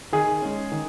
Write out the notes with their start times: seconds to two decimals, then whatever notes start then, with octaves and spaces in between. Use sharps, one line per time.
0.12 D#3 G#4
0.42 G#3 C#4
0.72 D#3